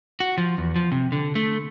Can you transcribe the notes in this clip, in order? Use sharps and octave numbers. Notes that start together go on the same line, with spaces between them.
F#4
F3
E2
F3
C3
D3
A3